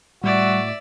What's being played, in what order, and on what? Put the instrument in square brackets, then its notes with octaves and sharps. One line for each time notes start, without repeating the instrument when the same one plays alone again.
[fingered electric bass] A2 [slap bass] G3 [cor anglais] F#4 [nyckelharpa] D5 E5